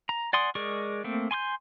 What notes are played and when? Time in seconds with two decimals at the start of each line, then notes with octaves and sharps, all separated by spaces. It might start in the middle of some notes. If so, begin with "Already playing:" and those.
0.09 A#5
0.33 D5 F#5 G#5 C6 D#6
0.55 G#3 G#4 A#4 D5 C#6
1.04 A3 A#3 C4
1.31 G#5 C6 C#6 G6